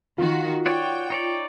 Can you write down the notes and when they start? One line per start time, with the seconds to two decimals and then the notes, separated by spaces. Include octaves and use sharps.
0.18 D#3 F4 F#4
0.66 F#4 C#5 D5 G5
1.10 D#4 C#5 D5